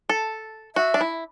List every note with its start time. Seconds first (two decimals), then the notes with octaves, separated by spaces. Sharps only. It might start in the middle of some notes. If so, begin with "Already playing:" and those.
0.09 A4
0.76 F#4 E5
0.94 D4
1.01 E4